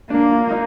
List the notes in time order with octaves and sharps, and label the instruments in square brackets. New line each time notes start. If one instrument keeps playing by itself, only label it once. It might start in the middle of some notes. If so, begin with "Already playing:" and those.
[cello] A#3 [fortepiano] D4
[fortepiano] F4
D#4